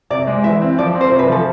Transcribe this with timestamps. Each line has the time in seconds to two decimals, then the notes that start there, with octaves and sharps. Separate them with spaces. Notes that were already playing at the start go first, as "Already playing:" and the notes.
0.10 C3 D5
0.27 G#3
0.44 E3 E5
0.62 C4
0.78 F3 D5
0.95 C4
1.01 C5
1.12 C3
1.19 B4
1.28 F3 A4